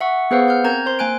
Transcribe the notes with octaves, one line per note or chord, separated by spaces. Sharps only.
E5 F#5 C#6
B3 G#4 B4 C5 F5 F#5
F6 G6
C4 A#4 A#5 G6 G#6
C5 C6
A#3 G#5 F#6 D7